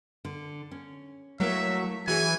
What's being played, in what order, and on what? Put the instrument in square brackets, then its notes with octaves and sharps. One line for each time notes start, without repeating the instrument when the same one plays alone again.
[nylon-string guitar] D3
C#4
[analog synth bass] F#3 [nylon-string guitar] A3 A#3 E4 [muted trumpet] E5
[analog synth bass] E3 [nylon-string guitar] F#4 G#4 C#5 [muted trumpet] G#5